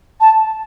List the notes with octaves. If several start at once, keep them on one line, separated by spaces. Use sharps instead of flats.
A5